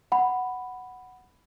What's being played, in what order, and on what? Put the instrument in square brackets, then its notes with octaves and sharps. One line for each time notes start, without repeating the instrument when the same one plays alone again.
[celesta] F#5 B5